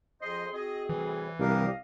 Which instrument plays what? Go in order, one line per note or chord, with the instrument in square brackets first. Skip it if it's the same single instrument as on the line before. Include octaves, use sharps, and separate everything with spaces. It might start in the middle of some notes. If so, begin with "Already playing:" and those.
[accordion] F2 C5 D#5 [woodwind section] G#4 C6
[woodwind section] C4 F#4 G#4 [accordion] D#5
[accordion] A2 C3 G3 [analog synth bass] E3
[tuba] C2 [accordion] D4 G4 A#4 [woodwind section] D#5 F5